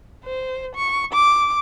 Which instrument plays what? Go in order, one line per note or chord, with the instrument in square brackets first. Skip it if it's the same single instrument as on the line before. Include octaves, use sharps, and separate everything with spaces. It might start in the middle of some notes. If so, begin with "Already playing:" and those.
[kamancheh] C5
C#6
D6